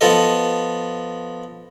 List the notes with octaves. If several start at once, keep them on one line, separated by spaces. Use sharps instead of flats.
F3 B3 A4 D#5